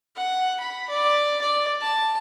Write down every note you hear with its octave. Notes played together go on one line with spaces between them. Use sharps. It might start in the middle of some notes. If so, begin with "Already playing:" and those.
F#5
B5
D5
D5
A5